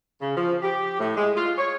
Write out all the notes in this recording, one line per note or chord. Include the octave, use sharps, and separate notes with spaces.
C#3
F3
G4
A2
G#3
F4
C#5